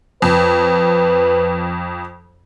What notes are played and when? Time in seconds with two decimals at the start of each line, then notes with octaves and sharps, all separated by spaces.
0.22 F2 B4